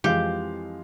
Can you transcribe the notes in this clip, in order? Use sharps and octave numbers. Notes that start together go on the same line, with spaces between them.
F2 E3 F3 G#3 G4 F5